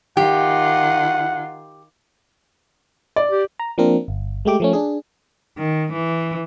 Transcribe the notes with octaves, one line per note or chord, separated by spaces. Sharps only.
D#3 F4 G4 F#5
D5
G4
A#5
F3 A#3 C4 D4 A#4
G1
G#3 A3 G4 D6
F3 A3 C#4
D4 G#4
D#3
E3